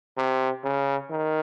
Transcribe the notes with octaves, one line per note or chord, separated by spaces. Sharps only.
C3
C#3
D#3